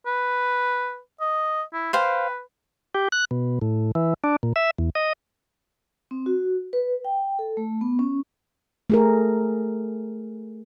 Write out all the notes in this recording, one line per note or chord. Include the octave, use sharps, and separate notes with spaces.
B4
D#5
E4
B4 C5 F5 G5
G4
F#6
B2
A2
E3
D4
A#2
E5
E2
D#5
C4
F#4
B4
G5
A4
A3
B3
C#4
A3 G#4 A#4